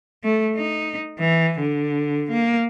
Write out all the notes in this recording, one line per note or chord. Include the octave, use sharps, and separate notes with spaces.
A3
D#4
E3
D3
A#3